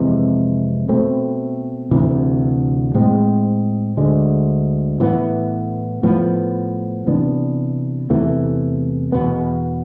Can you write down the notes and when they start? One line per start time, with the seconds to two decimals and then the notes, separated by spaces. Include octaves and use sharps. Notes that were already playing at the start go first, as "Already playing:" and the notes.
Already playing: F2 C3 E3 G#3
0.89 B2 A3 C4
1.91 D2 C3 E3
2.94 A2 G#3 C4
3.97 D2 D3 G#3
5.00 A2 E3 B3
6.03 A2 F3 B3
7.07 C3 E3 B3 D4
8.10 E2 C3 E3 A3
9.12 E2 B2 B3